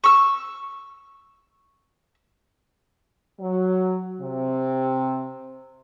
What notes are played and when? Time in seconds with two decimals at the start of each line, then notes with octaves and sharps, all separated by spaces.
0.04 C#6 E6
3.40 F#3
4.21 C3